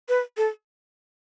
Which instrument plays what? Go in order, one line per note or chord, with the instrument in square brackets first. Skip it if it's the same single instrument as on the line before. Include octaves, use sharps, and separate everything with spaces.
[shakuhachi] B4
A4